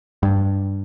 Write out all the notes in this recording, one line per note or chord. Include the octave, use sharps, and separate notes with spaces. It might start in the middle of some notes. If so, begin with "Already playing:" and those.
G2